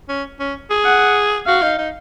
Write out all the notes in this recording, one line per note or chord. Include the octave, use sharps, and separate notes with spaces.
C#4
C#4
G#4
F#5
F#4 F5
D#4
D#4